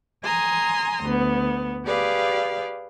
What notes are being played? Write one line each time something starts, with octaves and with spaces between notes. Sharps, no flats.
G#5 A#5 C6 D#6
D2 B3
G4 G#4 B4 D5 F5